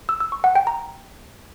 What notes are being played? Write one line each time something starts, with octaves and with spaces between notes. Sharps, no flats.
E6
E6
C#6
F#5
G5
A#5